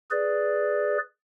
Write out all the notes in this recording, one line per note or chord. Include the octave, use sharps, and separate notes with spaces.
G#4 B4 D5